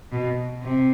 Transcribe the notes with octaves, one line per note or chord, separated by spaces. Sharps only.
B2
C3